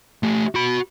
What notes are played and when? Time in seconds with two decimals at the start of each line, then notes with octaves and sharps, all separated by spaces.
0.23 A3 G4
0.55 F#4 B5